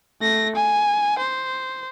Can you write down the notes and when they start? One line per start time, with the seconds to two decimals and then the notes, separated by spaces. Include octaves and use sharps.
0.21 A3 A#6
0.55 G#5
1.19 C5